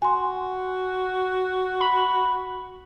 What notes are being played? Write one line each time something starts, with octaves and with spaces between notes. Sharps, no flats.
F#4 G#5 C6
B5